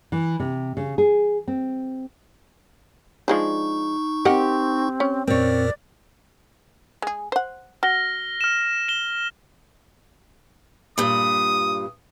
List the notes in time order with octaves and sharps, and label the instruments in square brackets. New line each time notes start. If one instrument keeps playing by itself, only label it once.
[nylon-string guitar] E3
C3
C#3
G#4
C4
[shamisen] F3 G#3 D4 [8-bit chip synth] D#4 C#6
[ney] C4 [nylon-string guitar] G4 [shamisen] A#4 D#5 F#5
[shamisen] C#4
[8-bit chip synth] F2 A#2 A#4 [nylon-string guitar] C4 C#5 [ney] D5
[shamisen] G#3 G#4
C5 F#5
[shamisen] F#4 [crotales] F6 A#6 G7
[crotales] F6 E7
E7 G7
[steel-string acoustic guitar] G2 A#2 [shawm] D#6